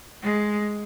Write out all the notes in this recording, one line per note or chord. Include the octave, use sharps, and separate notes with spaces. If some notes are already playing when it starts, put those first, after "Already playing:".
G#3